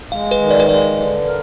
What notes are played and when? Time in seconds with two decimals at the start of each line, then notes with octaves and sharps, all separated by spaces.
0.12 G#3 F5
0.31 B4
0.41 D#3
0.50 D5
0.60 B4
0.69 G#3 D5
0.99 D3
1.27 A#4